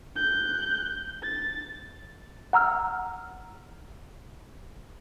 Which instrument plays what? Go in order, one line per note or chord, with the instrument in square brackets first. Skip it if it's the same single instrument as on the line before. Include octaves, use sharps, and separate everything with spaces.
[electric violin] F#6 G6
A6
[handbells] F#5 A#5 E6 F6